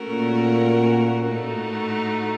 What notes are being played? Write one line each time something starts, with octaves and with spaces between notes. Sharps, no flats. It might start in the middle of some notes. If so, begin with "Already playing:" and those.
Already playing: A3 C#4 F#4 A#4
A#2
A2 A3 D#4 F#4